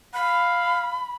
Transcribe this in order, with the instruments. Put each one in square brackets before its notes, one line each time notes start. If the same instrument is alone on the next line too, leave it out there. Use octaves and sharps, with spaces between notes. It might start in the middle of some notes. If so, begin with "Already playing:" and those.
[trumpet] F5 [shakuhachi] B5